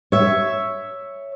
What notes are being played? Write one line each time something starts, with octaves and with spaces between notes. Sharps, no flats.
C#5 E5